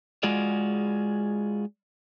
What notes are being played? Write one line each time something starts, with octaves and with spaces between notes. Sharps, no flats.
G#3 F4 F#4 G#4 D5